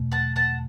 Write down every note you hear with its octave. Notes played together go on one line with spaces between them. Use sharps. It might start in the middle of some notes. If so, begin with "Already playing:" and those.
Already playing: E2 B2 A3
F#5 A5
F#5 A5